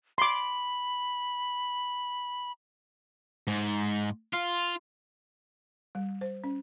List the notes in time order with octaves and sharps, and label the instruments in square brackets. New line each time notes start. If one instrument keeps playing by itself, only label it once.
[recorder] B5 [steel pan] C6 D6
[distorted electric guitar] G#2
F4
[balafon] G3
C5
C#4